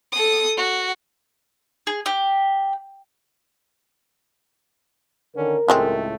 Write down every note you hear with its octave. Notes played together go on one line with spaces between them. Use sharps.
A4 D#6
F#4
G#4
G4
D3 D#3 C#4 A#4
C#2 A2 F#3 G#3 A3 C4